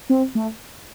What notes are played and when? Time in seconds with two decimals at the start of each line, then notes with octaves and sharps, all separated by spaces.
0.10 C4
0.35 A3